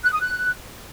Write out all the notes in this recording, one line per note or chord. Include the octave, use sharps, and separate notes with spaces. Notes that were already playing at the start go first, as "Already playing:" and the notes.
F#6
D#6
F#6